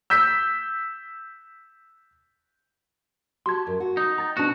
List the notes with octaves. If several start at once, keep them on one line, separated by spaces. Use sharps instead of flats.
E6 G6 B6
F#4 G4 A5 C6 G#6
F#2
F#4
D#4
G5 A#5 A6
B2 C4 D4 D#4 F#4 A#6